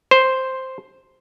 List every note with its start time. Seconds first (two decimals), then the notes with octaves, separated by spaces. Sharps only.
0.11 C5